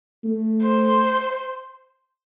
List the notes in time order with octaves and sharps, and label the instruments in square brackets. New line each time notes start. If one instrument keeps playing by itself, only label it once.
[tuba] A3
[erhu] C5